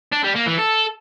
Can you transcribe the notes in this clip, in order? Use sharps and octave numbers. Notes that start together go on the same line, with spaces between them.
D4
G3
A#3
E3
A4